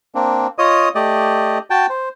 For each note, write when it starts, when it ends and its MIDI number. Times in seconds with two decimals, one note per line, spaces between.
0.15 0.47 58
0.15 0.47 60
0.15 0.47 62
0.58 0.89 65
0.58 0.89 73
0.58 0.89 75
0.58 0.89 87
0.95 1.58 57
0.95 1.58 67
0.95 1.58 74
0.95 1.58 75
1.70 1.86 66
1.70 1.86 79
1.70 1.86 81
1.90 2.09 72